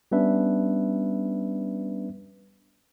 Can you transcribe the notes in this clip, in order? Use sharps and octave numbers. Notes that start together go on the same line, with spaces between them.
G3 B3 C#4 D4 B4 E5